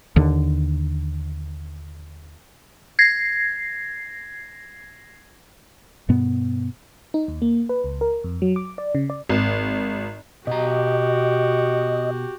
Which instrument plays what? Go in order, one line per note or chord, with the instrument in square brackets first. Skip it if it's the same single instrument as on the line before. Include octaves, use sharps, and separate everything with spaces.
[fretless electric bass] D#2 D3
[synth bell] G#6 A#6 C7
[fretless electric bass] G2 B2 B3
[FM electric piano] D#4
D#2
A#3
B4
C#2
A#4
F2
F#3
D6
D5
C#3
D5
[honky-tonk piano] G#1
[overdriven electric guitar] B2 A#5 [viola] F#4 G4 [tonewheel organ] D#5